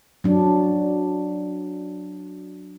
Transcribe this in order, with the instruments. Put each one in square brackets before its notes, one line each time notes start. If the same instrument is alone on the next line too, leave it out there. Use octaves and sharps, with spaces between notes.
[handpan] F#3 D4